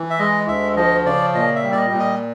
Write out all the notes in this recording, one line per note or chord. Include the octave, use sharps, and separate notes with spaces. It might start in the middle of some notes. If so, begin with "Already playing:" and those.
Already playing: E3
E5
G#3 D#5
D2 E5
F3 D#5
C#3 D5
A#2 D#5
E5
G3
D5
D#5
A#2
D#5